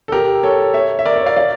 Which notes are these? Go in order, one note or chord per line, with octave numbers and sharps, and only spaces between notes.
A4
G4 A#4
A4 C#5
C#5 E5
E5
A#4 D5
C#5 E5
D5 F5
D5 F5